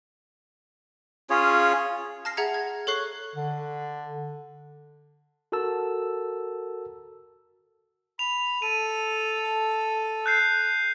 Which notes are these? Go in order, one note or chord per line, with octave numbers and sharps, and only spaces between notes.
C#4 F4 G#4 C#5
A5 F6 A#6 C7
G#4 E5 F#5 A#5 G#6 C#7
G#6
A4 C#5 C#6 F#6 C7
D3
F#4 A4 A#4 A5 E6
B5 F7
A4 D#7
F#6 G6 C7